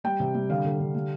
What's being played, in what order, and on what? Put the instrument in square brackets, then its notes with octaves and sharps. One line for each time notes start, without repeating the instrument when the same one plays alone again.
[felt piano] G3 G5
C3
G3
D3 F5
D3
D3
G3